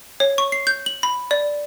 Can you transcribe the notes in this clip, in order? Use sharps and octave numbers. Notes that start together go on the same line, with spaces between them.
C#5
C#6
C7
G6
F#7
B5
D5